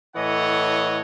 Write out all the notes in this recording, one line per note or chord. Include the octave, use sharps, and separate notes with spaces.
A2 E3 A4 C#5 D#5 F#5